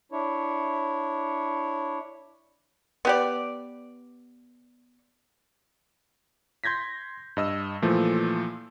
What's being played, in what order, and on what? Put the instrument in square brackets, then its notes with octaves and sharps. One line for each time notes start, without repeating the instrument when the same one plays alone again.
[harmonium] D4 E4 C#5
[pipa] B3 G4 D5
[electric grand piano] C6 G6 G#6 A#6 B6
G2 D#5 E6
A#2 E3 F3 A3